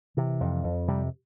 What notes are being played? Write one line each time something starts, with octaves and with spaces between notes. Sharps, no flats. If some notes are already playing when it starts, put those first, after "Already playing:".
C3 E3
F2
F2
C3 G3